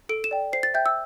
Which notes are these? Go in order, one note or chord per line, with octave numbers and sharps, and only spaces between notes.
A4 D7
E7
D5 G5
C5 C7
A6
E5 G5 G6
E6